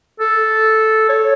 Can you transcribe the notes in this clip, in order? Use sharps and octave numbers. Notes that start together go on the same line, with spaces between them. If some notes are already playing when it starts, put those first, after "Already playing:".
A4
C#5